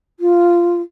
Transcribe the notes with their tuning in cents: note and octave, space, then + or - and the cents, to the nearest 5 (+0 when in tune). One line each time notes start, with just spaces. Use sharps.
F4 -10